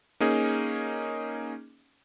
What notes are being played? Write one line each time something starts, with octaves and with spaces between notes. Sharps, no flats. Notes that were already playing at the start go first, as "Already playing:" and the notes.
A#3 C#4 D#4 G#4